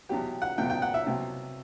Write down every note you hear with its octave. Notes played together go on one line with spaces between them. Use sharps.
E2 B2 F#3 G4
F#5
E2 B2 F#3 G5
G5
F#5
E5
C2 B2 F#3